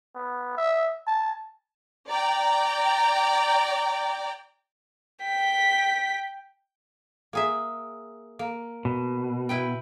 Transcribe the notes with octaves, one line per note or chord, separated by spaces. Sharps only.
B3
E5
A5
D5 G5 A#5
G5 B6
A#3 G#4 E5
A#3
B2
E4 B4 G5